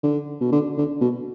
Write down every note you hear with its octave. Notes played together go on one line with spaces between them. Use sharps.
D3
B2
D3
D3
B2